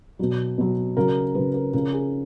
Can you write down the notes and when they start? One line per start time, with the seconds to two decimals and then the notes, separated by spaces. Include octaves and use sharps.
0.19 B2 F#3
0.58 B2 F#3
0.97 C#3 F#3 A#4
1.35 C#3 F#3 B4
1.54 A#4
1.73 C#3 F3 A#4
1.93 G#4